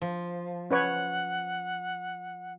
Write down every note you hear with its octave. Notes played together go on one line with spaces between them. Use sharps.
F3
C#4 B4 C#5 F#5